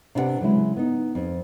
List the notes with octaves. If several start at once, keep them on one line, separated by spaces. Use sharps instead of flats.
C3 D4 E4 G4 B4 F#5
C#3 F#3 G#3 E4
B3 D#4
F2